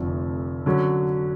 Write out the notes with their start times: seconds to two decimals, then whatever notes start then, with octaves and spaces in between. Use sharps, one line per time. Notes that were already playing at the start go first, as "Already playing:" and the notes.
Already playing: F1 F2 D3 F3 A3
0.66 D3 F#3 C#4